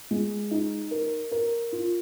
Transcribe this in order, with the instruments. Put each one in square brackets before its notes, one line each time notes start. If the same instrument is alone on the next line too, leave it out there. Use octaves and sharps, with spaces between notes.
[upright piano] G#3
D#4
A#4
A#4
F4